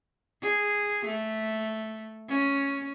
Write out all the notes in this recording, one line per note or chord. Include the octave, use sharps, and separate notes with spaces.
G#4
A3
C#4